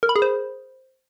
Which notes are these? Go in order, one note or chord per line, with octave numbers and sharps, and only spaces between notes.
A#4
B5
G#4
C5